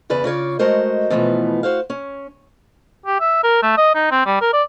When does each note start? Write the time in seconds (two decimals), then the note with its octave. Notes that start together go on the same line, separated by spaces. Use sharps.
0.10 E2 C#3 B4 D5
0.24 C#3 F4 C#5 D5
0.59 G#3 A3 F#4 A#4 C5 D#5
1.10 B2 E3 F3 A3 B3
1.63 F#4 C5 F5
1.90 C#4
3.06 G4
3.20 E5
3.43 A#4
3.63 A3
3.77 D#5
3.95 D#4
4.11 C4
4.26 G3
4.41 A#4
4.53 D5